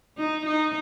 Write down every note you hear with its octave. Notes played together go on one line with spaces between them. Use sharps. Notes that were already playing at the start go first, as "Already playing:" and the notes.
D#4
D#4